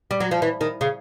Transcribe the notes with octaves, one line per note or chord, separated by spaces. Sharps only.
G3
F#3
F3
E3
D#3
C#3